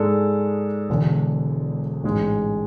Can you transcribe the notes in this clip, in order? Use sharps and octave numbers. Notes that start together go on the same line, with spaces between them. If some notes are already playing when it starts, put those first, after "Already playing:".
Already playing: G#2 G#3 D4 A4
E1 E2 D3
A1 G#2 G#3